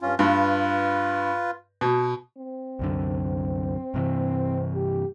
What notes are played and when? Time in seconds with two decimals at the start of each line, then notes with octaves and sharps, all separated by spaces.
0.01 G2 C#4 F4
0.19 G2 F4 B4
1.81 B2
2.38 C4
2.79 C2 F#2 D3
3.94 G2 C3 E3
4.75 G4